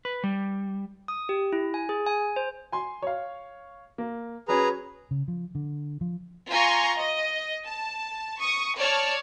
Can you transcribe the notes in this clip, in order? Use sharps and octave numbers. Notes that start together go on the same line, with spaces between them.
B4
G3
D#6
G4
E4
G#5
G#4
G#5
C5
G#5 C6
C#5 F5
A#3
F#3 C#4 G#4 B4 A#5
C#3
F3
D3
F3
F4 G#5 A#5 C6 C#6
D#5
A5
C#6 D#6
C#5 D5 A5 F6